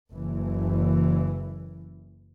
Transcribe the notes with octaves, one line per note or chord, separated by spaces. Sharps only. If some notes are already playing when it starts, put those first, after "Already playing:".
F#1 E3